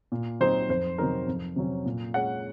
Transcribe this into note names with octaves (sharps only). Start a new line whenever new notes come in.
A#2
F#3 C4 D#4 C5
F2 C5
C3 F#3 C4 D#4 A#4
F2
C3 F#3 C#4
A#2
G#3 C#4 F#5